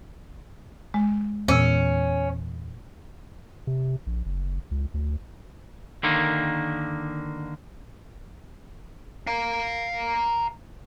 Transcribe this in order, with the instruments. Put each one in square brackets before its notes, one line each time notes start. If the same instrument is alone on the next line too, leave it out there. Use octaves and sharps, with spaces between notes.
[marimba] G#3
[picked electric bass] E2 E3 B3 [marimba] A#2 E6 [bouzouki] C#4
[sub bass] C3
A#1
F#1
C#2
D2
[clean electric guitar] D3 D#3 A#3
[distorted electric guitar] F5 A#5